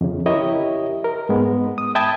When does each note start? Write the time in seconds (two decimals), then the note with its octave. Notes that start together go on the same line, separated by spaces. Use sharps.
0.01 F2 C#3
0.26 E4 G4 A#4 C#5 D#5 E5
1.04 A#4
1.29 G#2 G#3 B3
1.78 D#6
1.95 E5 G5 A5 B5 D#6 G#6